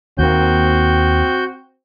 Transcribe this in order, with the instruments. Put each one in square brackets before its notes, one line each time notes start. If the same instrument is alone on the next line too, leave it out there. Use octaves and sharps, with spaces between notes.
[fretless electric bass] D#2 A#3 [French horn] C4 [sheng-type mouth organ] F#4 G6